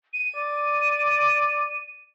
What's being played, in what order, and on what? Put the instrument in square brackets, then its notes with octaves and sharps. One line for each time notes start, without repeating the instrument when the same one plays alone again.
[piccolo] D#7
[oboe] D5